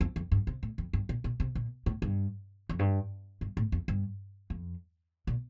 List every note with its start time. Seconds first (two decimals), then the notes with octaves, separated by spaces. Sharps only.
0.01 F2
0.16 F2
0.32 G2
0.47 C3
0.63 A2
0.78 F2
0.93 G2
1.09 A#2
1.24 A#2
1.40 C3
1.55 A#2
1.86 A2
2.02 G2
2.69 F2
2.79 G2
3.41 G2
3.57 A2
3.72 F2
3.88 G2
4.50 F2
5.27 A#2